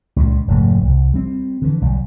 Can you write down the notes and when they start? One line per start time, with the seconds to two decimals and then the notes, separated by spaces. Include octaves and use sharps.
0.16 C#2 A#2
0.47 F1 G#2 C#3 A3
0.84 C2
1.14 G3 C4
1.62 D3 E3
1.81 B1 G3